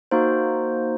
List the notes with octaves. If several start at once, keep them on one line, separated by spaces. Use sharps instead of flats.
A#3 D#4 F#4 C5